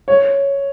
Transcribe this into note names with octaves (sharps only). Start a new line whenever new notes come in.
C#5